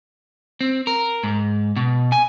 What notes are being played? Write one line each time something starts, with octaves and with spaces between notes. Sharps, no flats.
C4
A#4
G#2
B2
G#5